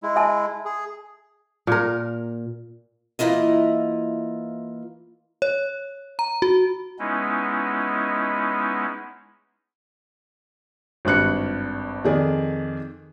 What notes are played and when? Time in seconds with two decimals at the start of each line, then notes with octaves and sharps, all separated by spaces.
0.03 G#3 E4
0.16 E5 G#5 A5
0.65 G#4
1.67 A#2 A#4
3.19 E3 A#3 E4 F4 D#5
5.42 C#5
6.19 A#5
6.42 F#4
6.99 G#3 B3 C#4 D#4 E4
11.05 G#1 G2 F#6 C#7
12.04 F2 D#3 G#4 D5